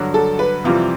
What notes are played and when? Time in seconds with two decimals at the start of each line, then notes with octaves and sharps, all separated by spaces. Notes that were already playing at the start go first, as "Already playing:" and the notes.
Already playing: G2 D3 F#3
0.14 A4
0.39 B4
0.64 F2 C3 E3 G3 C4 F4